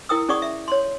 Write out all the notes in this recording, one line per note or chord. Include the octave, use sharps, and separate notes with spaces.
E4 A#4 G5 D#6 E6
C#4 G#4 D5 F#5 C#6 D#6
E5
C#5 C6